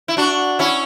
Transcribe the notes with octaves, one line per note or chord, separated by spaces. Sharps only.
E4
D4 F#4
C#4 E4